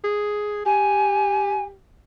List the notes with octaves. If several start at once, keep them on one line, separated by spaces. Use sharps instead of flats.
G#4
G4 G#5